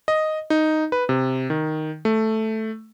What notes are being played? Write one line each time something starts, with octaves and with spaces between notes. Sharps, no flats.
D#5
D#4
B4
C3
D#3
A3